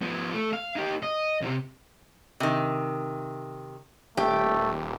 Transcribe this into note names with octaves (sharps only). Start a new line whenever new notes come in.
F3 B3
A3
F5
D#4 G4
D#5
C#2 C3
C3 D#3
D#1 A3 G4